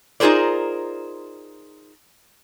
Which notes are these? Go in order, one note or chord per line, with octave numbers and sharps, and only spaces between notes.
D#4 F4 G#4 A#4 C5 D5